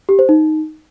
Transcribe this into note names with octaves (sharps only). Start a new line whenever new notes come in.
G4
C5
D#4